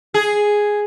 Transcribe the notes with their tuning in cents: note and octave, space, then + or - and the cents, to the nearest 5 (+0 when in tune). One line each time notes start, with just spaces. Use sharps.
G#4 +0